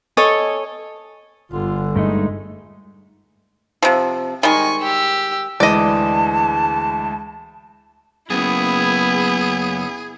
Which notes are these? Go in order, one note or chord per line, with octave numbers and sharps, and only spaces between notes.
A4 C#5 D#5 G#5
G1 D3 F4
G2 G#3 A3 D#4
C3 F3
D#3 G3 G#3 G#5 C#6
G4 E6
D2 E3 G#3 D5 D#5 A5
F#2 C#3 B3 E4 G#4